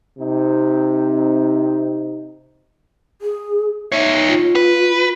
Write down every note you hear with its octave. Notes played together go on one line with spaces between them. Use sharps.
C3 C4 D#4
G#4
D#4 C#5 E5
F4
B4